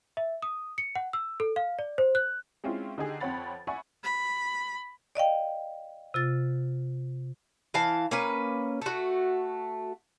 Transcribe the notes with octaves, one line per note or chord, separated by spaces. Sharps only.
E5
D#6
C#7
F#5
E6
A4
F5
D5
C5
F#6
G#3 C4 C#4 E4 F4
D3 D#4 G4 G#4
F2 C4 C#5 F#5 B5 A6
D5 E5 F#5 G#5 B5 C#6
B5
D5 D#5 F5 G5
C3 F4 A6
E3 F5 A5
A#3 C#4 B4
A3 F#4